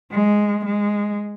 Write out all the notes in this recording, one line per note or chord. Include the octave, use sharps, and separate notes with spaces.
G#3
G#3